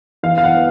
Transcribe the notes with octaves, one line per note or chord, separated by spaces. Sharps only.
E3 F5
F5
F#5
B3